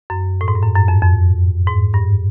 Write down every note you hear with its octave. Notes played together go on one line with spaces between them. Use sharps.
F#2
A2
G#2
G2
F#2
F#2
F2
F2
G#2
G2